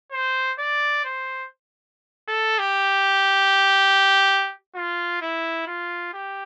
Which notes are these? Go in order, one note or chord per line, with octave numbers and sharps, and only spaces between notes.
C5
D5
C5
A4
G4
F4
E4
F4
G4